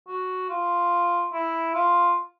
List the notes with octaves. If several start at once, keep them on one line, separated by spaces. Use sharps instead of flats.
F#4
F4
E4
F4